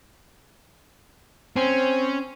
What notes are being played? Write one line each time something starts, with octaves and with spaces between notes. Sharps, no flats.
C4 C#4